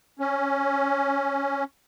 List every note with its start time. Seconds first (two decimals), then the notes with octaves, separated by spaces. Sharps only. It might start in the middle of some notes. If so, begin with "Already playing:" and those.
0.19 C#4